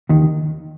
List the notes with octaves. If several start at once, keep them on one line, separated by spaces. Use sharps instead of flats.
D#2 D#3